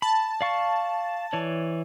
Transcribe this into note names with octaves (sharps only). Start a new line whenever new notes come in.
A5 B5
D5 F5 C#6
E3 C#5 D5